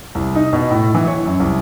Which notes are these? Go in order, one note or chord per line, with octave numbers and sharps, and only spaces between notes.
C2
D#4
B2
A2
E3
C#5
F#2
C2